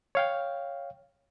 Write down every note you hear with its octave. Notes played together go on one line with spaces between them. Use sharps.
C#5 F5 G5